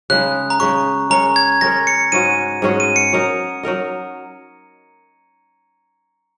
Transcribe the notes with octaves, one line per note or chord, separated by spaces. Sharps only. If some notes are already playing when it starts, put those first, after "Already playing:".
C#3 G#3 D#4 F#6
A#5
C#3 G#3 D#4 C#6
G#3 C#4 A#4 C#5 A#5
G#6
G#3 C#4 A#4 C#5 A#6
C#7
G#2 G#3 C#4 F#4 D#7
G#2 G#3 C#4 F#4
D#7
C#7
F#3 D#4 A#4 D#5
F#3 D#4 A#4 D#5